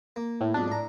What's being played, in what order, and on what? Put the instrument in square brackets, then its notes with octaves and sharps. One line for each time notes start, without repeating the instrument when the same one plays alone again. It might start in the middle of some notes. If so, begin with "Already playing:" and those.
[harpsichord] A#3
[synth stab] A2
[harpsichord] B1 F2 G#2 [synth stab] D4
[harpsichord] A2 A#5